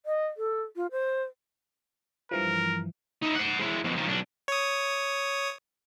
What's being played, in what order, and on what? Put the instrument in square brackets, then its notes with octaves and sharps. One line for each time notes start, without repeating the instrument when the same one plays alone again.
[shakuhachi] D#5
A4
F4
C5
[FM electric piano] G2 E3 F3 [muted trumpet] A#4
[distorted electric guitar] D#4 E4
C5 F#5
G#3 E4
F2 B2
D#3 F3
B1 D4
[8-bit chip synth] C#5 D#6